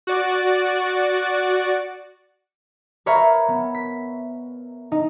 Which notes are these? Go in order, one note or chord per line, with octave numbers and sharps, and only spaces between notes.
F#4 D5
A#4 B4 C#5 E5 F5 A#5
B3
B6
D#4